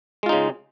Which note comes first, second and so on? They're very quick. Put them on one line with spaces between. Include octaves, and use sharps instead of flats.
G#3 F4 D#4 C#3